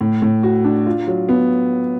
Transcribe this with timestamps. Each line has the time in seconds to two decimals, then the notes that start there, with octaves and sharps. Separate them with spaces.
0.01 A2
0.22 A2
0.43 F#4
0.64 D4
0.86 F4
1.07 F#3
1.29 B3